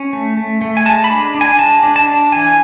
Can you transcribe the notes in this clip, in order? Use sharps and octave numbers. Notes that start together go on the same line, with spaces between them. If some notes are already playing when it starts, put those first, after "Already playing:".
Already playing: C#4
A3
A3
A3
G#5
G#3 A5
B5
D4
D4
G#5
G#3 A5
D4
A5
D4
E3 G#5